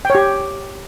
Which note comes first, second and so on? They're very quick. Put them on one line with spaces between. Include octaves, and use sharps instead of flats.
G5 C#5 G4